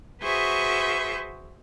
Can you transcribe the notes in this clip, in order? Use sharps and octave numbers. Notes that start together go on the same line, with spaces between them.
F#4 G#4 B4 C5 E5 C#6